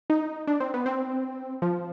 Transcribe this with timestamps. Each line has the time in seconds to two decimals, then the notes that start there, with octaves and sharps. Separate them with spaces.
0.10 D#4
0.47 D4
0.60 C4
0.74 B3
0.86 C4
1.62 F3